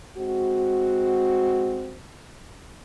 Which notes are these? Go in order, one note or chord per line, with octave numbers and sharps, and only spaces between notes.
G#3 C4 F#4